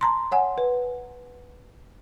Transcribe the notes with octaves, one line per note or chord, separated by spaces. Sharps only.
A5 A#5 C6
C#5 F#5 G#5
B4